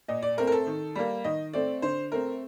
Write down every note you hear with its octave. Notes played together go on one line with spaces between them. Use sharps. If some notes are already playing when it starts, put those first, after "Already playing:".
A#2 D#5
D5
A3 C4 A#4
A#4
A4
D#3
G3 A#3
D#3 D#5
A3 C4 D5
D3 C5
A3 C4 A#4